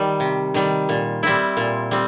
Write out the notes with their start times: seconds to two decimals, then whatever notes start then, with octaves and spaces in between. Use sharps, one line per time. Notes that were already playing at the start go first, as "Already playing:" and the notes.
Already playing: D#3 G3
0.20 C3
0.54 D#3 G3
0.89 A#2
1.23 G3 C4 E4
1.57 A#2
1.91 G3 C4